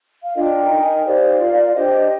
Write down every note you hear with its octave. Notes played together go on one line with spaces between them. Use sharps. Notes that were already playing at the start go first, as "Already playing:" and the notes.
F5
D4 F4 A#4 D#5 G5
A#5
D#4 A#4
G#5
G5
D#4 G4 C5 D5 F5
F4 A#4
D4 G4 C5 D#5 G5